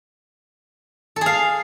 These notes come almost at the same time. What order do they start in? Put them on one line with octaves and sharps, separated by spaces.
A4 G#4 F5